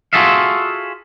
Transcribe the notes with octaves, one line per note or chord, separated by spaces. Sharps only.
F4 F#4 G#4 A4 E5 F5